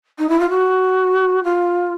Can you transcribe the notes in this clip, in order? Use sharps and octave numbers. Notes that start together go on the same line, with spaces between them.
D#4
E4
F4
F#4
F4